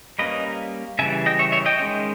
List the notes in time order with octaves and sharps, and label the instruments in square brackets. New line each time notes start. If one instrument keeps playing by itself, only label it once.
[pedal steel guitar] G3 A#3 C#4 B4 D#5
C#3 E3 G3 E5 G#5
D#5 G5
C#5 E5
C#5 E5
D#5 G5
D#3 G#3 C#4